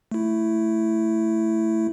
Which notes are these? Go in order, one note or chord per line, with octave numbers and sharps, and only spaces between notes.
A3 E4